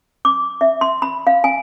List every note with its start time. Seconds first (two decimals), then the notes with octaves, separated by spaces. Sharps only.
0.25 D6
0.61 E5
0.81 C6
1.02 B5
1.27 F5
1.44 G#5